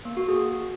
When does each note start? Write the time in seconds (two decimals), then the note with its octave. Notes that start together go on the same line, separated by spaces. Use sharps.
0.05 A#3
0.17 F#4
0.29 G#4